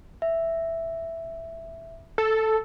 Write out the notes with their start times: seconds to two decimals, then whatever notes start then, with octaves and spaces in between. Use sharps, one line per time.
0.22 E5
2.18 A4